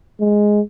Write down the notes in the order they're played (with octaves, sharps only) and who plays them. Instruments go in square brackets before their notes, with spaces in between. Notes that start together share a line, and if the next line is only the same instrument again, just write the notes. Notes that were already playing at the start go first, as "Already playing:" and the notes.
[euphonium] G#3